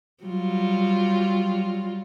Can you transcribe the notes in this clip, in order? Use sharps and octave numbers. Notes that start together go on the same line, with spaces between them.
F#3 G3 F4